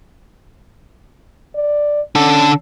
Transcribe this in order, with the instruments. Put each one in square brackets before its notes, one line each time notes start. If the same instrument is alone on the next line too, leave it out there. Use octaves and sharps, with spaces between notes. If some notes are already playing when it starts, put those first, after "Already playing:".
[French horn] D5
[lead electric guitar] D3 A4 [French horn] C#4